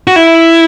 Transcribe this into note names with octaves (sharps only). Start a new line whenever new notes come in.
F#4
E4